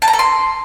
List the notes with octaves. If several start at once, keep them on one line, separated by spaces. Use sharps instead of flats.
A5
A#5
A4
C6